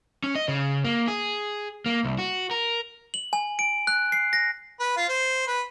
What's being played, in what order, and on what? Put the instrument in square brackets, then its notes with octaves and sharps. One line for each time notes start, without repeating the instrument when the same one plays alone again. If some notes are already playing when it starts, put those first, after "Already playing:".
[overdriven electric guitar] C#4
D#5
C#3
A#3
G#4
A#3
C2
F#4
A#4
[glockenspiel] F#7
G#5
D7
F#6
C7
A#6
[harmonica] B4
F4
C5
B4